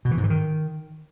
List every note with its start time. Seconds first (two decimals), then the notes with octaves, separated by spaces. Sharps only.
0.05 B2
0.11 E3
0.17 G#2
0.24 E3
0.30 D#3